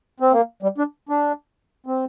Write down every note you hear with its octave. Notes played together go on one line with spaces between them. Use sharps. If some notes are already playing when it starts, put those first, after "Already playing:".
C4
A#3
G3
D4
D4
C4